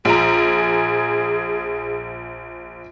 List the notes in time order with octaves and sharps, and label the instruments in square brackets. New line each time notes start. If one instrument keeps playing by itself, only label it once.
[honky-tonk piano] A#1 A#5 [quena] G#4